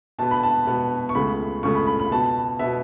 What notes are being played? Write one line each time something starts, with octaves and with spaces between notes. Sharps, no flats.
B2 B3 A5
B5
A5
B2 B3
C#6
C#2 C#3 A3 B5
C#2 C#3 A3 C#6
B5
B5
B5
B2 B3 A5
B2 B3 E5